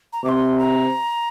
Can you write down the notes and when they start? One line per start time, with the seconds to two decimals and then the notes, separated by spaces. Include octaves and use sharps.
0.13 A#5
0.24 C3 C6 D6
0.59 A#5